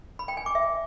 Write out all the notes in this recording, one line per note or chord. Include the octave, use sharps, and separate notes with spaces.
B5
G5
G#5
D6
E5